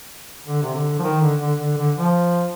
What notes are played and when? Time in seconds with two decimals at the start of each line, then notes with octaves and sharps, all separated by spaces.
0.46 D3
0.62 C3
0.75 D3
0.99 F3
1.03 D#3
1.21 D3
1.41 D3
1.59 D3
1.77 D3
1.96 F3